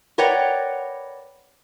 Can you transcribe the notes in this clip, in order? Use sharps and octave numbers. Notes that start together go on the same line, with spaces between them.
A#4 B4 C#5 D5 F#5 G5